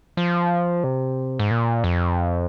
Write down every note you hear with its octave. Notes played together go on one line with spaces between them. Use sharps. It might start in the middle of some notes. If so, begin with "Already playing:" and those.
F3
C3
G#2
A#2
F2